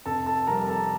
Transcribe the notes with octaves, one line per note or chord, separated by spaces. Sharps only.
F1 A4 A5
A4 A5
F2 C3 G3 A#4 A#5
A4 A5